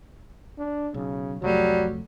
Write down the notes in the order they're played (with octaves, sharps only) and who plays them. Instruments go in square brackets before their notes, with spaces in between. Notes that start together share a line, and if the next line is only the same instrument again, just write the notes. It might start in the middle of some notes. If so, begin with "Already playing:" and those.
[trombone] D4
[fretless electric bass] B1 [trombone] C#3
[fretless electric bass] C2 F2 A3 [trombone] F#3 [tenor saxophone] G3